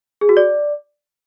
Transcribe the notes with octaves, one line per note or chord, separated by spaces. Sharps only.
G#4
F#4
D5